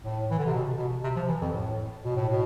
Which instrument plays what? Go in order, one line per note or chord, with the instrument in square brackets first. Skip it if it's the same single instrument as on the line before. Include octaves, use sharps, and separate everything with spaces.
[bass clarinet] A2
E3
D3
C3
B2
B2
C3
F3
E3
F2
A2
B2
A2
B2